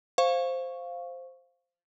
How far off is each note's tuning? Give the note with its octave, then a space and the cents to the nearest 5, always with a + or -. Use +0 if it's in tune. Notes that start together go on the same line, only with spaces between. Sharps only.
C5 +0 F5 +0 C#6 +0